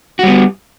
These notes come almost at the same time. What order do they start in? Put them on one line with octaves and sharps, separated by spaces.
F#4 G3 B3